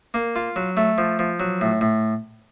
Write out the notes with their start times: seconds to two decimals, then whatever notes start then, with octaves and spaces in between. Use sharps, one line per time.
0.14 A#3
0.36 F4
0.56 F#3
0.77 A3
0.98 F3
1.19 F3
1.40 F#3
1.61 A2
1.81 A2